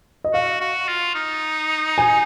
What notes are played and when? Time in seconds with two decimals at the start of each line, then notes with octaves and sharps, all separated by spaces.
0.24 D#5
0.34 F#4 F5
0.61 F#4
0.88 F4
1.15 D#4
1.98 G#5